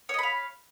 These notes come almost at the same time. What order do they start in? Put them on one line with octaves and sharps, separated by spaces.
C#5 D#5 B5 F5